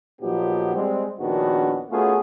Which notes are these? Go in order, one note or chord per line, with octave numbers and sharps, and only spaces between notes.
A#2 F3 F#3 B3 D#4 G4
G3 G#3 C4
A#1 D#3 B3 C#4 D4 F#4
A3 B3 C#4 F4 F#4 G#4